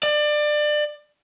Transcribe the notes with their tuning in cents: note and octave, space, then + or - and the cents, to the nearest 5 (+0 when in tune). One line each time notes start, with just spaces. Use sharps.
D5 +25